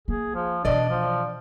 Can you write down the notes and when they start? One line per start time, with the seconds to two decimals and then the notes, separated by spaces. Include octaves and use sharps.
0.08 A#3 G#4
0.35 F3
0.65 B2 E3 D4 D5 D#5
0.89 F3